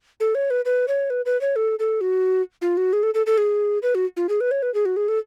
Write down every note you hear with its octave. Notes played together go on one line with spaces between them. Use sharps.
A4
C#5
B4
B4
C#5
B4
B4
C#5
A4
A4
F#4
F4
F#4
G#4
A4
A4
A4
G#4
B4
F#4
F4
G#4
B4
C#5
B4
G#4
F#4
G#4
A4